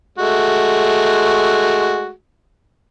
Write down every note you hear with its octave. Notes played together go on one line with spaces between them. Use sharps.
G#3 A3 F#4